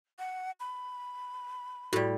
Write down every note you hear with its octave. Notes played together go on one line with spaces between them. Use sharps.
F#5
B5
A2 G3 F#4 D5